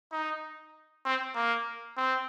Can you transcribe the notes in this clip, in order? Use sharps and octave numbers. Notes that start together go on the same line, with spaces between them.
D#4
C4
A#3
C4